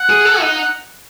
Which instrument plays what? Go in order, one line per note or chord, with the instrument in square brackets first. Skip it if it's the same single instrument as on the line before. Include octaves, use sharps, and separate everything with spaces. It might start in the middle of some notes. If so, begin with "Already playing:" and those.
Already playing: [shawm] F#5
[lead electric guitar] G#4
A4
D#4
[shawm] F#5